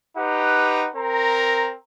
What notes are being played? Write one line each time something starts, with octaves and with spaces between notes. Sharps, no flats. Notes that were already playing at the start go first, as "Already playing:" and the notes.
D#4 G4 B4 F#5
C4 A#4 A#5